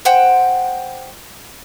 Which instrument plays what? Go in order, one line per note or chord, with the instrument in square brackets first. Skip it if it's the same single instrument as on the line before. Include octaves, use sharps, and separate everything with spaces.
[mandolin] C5 F#5 G5